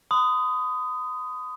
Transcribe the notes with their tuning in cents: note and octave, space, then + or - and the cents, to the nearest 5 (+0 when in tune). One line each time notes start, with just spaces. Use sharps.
B5 +45 D#6 +0